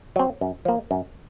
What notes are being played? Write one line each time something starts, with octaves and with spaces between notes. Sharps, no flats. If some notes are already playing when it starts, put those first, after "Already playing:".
F#3 C4
F#2
F3 A#3
F#2